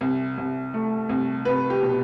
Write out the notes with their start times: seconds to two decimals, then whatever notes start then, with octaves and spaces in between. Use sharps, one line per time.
0.01 C2
0.38 C2
0.74 A3
1.09 C2
1.45 C2 B4
1.70 G4
1.83 B2